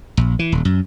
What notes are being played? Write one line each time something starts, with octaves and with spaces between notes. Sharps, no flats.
A#1
E3
D#1
F#2